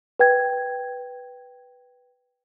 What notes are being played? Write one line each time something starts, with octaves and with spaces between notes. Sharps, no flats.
B4 G5 G#6